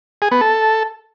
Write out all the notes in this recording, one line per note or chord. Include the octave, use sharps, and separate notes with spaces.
G#4
B3
A4